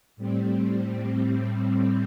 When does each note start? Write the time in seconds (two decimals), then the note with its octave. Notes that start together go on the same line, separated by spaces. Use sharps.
0.16 A2 G3 C4